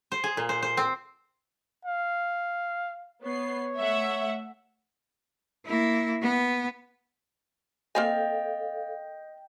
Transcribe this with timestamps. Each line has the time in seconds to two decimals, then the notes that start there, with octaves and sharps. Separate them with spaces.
0.12 C5
0.24 G#4
0.37 A#2
0.49 C5
0.62 C5
0.77 C4
1.85 F5
3.23 B3 C#5 C7
3.77 A3 E5 F#5
5.66 A#3 E4
6.22 B3
7.95 A#3 C4 A4 D#5 F5 G5 G#5